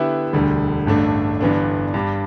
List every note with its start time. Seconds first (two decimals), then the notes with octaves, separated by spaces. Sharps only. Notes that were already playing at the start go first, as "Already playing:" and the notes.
Already playing: D3 B3 E4 G4 E5
0.33 E1 D2 D3 G3
0.87 A1 G2 D3 A3 D4
1.41 G1 G2 E3 B3 D4
1.94 G2 G3 D4